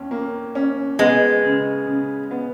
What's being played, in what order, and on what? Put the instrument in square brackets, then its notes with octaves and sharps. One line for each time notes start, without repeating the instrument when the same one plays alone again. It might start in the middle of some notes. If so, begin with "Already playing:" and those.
Already playing: [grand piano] D#2 C#4
A#3
C#4
[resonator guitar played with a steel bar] G#3 [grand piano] B3
[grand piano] C#3
C#3
B3